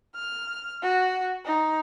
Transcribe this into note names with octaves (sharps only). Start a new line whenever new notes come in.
F6
F#4
D#4